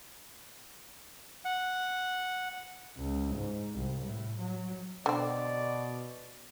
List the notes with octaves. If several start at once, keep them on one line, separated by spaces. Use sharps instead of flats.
F#5
C#2
G#2
C2
A2
F#3
B2 D3 C4 D5